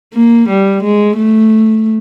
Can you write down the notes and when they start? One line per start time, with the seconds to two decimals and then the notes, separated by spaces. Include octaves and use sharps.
0.14 A#3
0.49 G3
0.83 G#3
1.17 A3